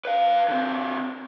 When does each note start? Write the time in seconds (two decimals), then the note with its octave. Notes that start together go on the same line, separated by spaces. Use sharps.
0.05 B4 F5
0.48 D3 C4